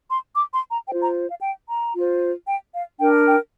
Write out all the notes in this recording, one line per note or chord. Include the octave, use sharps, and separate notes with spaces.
C6
D6
C6
A#5
F4 C5 G5
A#5
F5
G5
A#5
F4 C5
G5
F5
D4 A#4 G5
G5